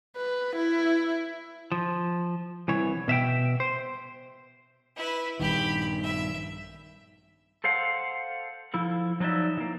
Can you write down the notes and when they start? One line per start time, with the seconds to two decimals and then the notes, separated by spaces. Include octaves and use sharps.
0.17 B4
0.56 E4
1.72 F3
2.68 C2 E3 C#5
3.08 B2 E5 F5 G5
3.60 C5
4.96 E4 B4
5.40 A#1 G2 D#3 G4 B5
6.03 E5
7.64 A4 C5 F5 F#5
8.74 F3 E4 A4
9.20 F3 F#3 D#4 D5 E5
9.57 E3 A#3